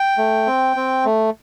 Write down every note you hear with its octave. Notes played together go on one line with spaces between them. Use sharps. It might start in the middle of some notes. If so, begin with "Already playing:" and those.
Already playing: G5
A3
C4
C4
A3